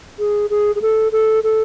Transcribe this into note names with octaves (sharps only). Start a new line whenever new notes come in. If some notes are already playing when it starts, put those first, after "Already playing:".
G#4
G#4
G#4
A4
A4
A4